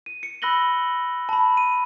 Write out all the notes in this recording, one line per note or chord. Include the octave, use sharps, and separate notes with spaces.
D#7
C#7
B5 E6 F#6 A#6 F#7 G7
A5 B5
D#7